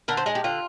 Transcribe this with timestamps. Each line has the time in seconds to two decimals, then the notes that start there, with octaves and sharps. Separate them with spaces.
0.08 D3 A#4
0.17 C5
0.26 G#3 G#4
0.35 G4
0.44 D3 F4